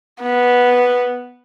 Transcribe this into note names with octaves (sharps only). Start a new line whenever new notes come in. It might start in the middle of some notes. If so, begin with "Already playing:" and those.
B3